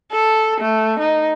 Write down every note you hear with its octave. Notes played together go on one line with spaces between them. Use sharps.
A4
A3
D#4